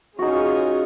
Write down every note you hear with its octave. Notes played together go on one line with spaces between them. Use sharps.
C#4 D#4 F4 F#4 G#4